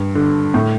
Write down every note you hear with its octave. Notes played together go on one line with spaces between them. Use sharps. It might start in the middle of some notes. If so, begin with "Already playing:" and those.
Already playing: G2
D3
A2